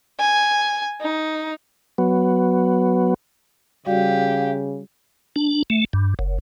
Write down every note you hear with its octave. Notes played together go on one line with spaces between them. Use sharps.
G#5
D#4
F#3 B3
C#3 G3 F#4 G4 D5 F5
D4
A3
G2
F#1